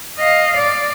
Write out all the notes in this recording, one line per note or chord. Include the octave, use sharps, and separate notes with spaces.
D#5 F5
D5